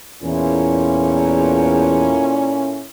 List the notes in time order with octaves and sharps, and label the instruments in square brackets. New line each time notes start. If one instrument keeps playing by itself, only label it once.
[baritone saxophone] E2 [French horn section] A#2 E4 A4 [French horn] C#4